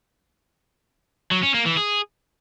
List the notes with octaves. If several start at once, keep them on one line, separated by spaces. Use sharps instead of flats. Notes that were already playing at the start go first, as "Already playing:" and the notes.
F#3
C#4
A#3
E3
G#4